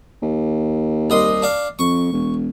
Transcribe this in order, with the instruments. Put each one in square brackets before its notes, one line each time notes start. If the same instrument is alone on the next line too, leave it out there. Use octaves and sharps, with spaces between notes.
[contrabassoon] D#2
[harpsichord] C2 D#5 C6
D4 F5
[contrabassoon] F2 [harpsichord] C#6
[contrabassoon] E1